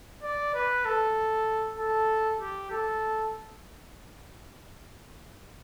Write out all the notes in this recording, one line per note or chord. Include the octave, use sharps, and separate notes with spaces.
D5
B4
A4
A4
G4
A4